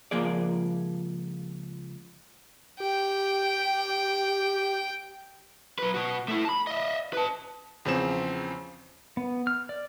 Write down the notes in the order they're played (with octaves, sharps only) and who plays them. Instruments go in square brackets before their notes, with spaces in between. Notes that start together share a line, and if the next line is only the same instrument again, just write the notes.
[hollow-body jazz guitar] C#2 F3 A#3 G#4 D5
[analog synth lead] G4 [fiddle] G5
[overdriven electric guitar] F#3 B4
B2 F#4
A3 E4
A5 B5
D#5 E5
B4 A5
[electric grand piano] E2 C#3 F3 C4 E7
[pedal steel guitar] B3
F6
D5